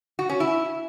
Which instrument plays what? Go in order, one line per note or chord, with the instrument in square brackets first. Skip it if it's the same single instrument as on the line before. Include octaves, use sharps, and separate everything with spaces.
[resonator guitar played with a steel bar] F#4
C#4
E4